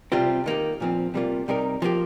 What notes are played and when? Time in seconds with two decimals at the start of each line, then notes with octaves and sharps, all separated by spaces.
0.12 C3 G3 C4 F4
0.46 D#3 A#3 G4
0.80 A#2 F3 C4
1.14 C3 G3 A#3 F4
1.48 C3 G3 D#4 A#4
1.82 F3 A#3 G4